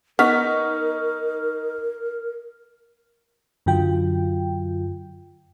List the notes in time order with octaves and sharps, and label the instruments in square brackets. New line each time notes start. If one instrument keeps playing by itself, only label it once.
[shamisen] B3 [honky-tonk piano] D#4 C#6 B6 [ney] A#4 [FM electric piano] F6
[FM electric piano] F#2 D3 F#3 F4 G5